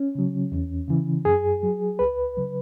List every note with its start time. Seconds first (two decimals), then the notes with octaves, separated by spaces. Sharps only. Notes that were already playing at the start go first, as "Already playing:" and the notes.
Already playing: C#4
0.15 C#3 F#3
0.52 E2
0.88 C#3 E3
1.25 F#2 G#4
1.63 F#3
1.99 C#2 B4
2.37 C#3 F#3